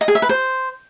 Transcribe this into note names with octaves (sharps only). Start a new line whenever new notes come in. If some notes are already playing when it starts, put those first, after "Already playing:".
D#5
G#4
E5
B4
C5